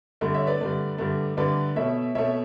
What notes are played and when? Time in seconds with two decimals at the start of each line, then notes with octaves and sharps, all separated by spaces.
0.21 G2 D3 A3
0.34 C#5 E5
0.47 B4 D5
0.60 G2 D3 A3
0.98 G2 D3 A3
1.37 G2 D3 A3 B4 D5
1.76 B2 A3 C#5 E5
2.15 B2 A3 C#5 E5